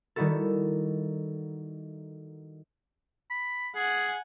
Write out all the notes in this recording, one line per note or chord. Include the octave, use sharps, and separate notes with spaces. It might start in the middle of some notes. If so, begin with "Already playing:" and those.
D#3 G3 D#4 E4 F#4 A4
B5
G#4 F#5 G#5